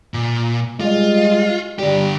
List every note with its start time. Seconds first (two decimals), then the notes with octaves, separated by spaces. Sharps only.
0.14 A#2
0.81 G3 G#3 F4 D#5
1.79 D3 G3 G4